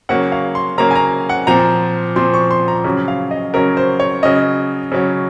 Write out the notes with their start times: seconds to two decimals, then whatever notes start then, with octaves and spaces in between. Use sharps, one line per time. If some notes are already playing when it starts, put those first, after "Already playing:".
0.09 C#3 F#3 A#3 C#4 F#5
0.32 F5
0.55 C6
0.78 C#3 F#3 A#3 C#4 A#5
0.91 G#5
0.95 A#5
1.29 F#5
1.47 A#2 F3 C4 A#5
2.16 A#2 F3 C4 C6
2.34 C#6
2.51 C6
2.68 A#5
2.84 C#3 F#3 C#4
3.08 F5
3.31 D#5
3.54 C#3 F#3 C#4 A#4
3.77 C5
4.00 C#5
4.23 C#3 F#3 C#4 D#5
4.92 C#3 F#3 C#4